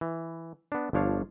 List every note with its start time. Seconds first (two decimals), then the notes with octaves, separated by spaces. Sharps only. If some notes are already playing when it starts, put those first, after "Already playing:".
0.01 E3
0.72 B3 D4
0.93 G1 F3 D4 C#5 F5